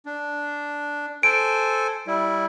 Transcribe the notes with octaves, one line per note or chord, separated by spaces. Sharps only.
D4
A4 C5 G#5 D7
G3 E4